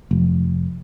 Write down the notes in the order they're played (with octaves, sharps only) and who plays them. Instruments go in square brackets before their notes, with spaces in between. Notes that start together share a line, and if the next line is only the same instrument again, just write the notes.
[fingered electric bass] F1